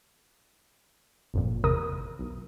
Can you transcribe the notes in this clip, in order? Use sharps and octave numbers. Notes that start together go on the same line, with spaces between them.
G1 F2 A#2
G#1 E2 C3 A#4 D#6
B1